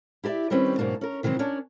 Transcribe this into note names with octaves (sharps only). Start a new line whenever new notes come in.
E4 G4 A4 D5 E5
D#3 G3 C4 C#4 B4
G#2 B2 F#3 A#3 D4
C#4 A#4
C3 D#3 E3 F#3 C4
C#4 D4 A#4 C#5 D5